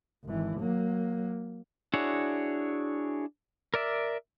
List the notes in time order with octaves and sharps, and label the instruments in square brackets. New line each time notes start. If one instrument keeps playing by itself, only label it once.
[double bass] G#1 E3
F#3 A#3
[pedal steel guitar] D4 E4 F#4 G#4 C#5
A#4 D5 E5